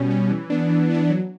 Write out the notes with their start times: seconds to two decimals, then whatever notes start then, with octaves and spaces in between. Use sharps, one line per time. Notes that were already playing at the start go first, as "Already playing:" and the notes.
Already playing: B2 G3 C#4
0.10 G3 C#4
0.30 E3
0.50 B3 D4
0.70 E3
0.90 B3 D4
1.10 F#3